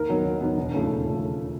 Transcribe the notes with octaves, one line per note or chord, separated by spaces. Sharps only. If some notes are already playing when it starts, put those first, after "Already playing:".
Already playing: D#2 A#4
D#3 F#3 B3
D#2
D#3 F#3 B3
E1
D#2 C#3 F3 A3
E1
C#3 F3 A3